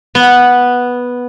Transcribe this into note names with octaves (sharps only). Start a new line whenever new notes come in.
B3